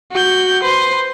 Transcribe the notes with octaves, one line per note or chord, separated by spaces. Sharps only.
F#4 G6
B4 C5